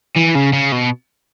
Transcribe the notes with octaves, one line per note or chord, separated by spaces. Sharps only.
E3
C#3
C#3
B2